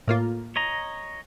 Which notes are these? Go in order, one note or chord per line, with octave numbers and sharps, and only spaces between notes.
A2 A#3 F4
C#5 D#5 A#5